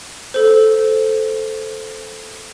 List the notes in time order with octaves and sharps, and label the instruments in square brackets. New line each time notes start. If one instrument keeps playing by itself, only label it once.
[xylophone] A4 C5